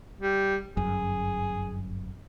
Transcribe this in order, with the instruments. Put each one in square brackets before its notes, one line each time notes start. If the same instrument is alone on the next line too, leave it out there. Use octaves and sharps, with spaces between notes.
[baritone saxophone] G3
[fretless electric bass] G1 F#2 [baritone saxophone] G#4